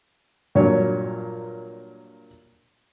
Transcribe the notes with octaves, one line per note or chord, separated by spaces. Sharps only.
G2 A#2 F#3 C#5